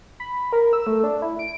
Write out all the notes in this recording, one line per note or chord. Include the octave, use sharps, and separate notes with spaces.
B5
A#4
E6
A3
D4
E4
D7